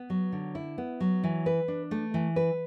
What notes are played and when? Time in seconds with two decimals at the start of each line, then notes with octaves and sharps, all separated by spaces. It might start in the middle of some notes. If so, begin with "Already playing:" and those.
Already playing: B3
0.10 F#3
0.32 D3
0.55 E4
0.78 B3
1.00 F#3
1.23 E3
1.46 B4
1.68 D4
1.91 A3
2.14 E3
2.36 B4